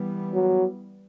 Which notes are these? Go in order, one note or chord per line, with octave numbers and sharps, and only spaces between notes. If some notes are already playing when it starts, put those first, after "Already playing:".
Already playing: E3 G3 B3
F#3